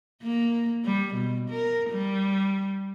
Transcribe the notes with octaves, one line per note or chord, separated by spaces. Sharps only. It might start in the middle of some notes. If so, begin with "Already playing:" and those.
A#3
G3
B2
A#4
G3